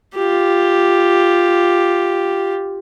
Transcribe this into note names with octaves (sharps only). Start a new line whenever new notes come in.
F4 G4